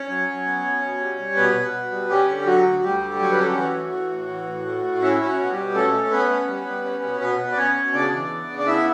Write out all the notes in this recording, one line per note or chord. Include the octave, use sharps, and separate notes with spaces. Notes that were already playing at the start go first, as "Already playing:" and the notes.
Already playing: C#4 C#5
F#3
F#3
B3
B2
B2
G3
G3
B2 B3 B4
B2
B2
G3
G3 C#4 G4
D3
F#3 F#4
D2
D2 G3 G4
D3
F#3 C#5
B4
C#4 A4
G4
E3 F#4
A3
E3
A2
E3
A2
A3
A2
C#4 E4
C#4
F#4
B2
G3 G4
B2
A3 C#4 A4
A3
B3 C#4 B4
C#4
G3
G3
C#4
B2
B2 B3 B4
B2
D5
B2 C#4 C#5
B2
C#3 D4 D5
E3
B3
C#3
D5
B3 E4 E5